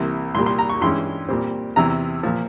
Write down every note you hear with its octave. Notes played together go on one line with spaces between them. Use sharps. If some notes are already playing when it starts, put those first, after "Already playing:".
Already playing: C2 C3 E3 A#3
C2 A#2 G3 C6
C6
A#5
C#6
G2 E3 G#3 C#4 C6
A#2 G3 C4
E2 C3 E3 A#5
A#2 F3